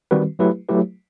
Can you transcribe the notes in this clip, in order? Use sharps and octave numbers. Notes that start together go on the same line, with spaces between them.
D#3 G3 C4 F#4 B4
F#3 A3 E4 G4 B4
F#3 A3 E4 G4 B4